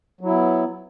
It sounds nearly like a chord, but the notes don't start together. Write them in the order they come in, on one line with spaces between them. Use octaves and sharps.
F#3 E4 B3